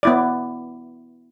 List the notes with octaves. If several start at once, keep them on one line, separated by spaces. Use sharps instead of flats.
B3 E4 D5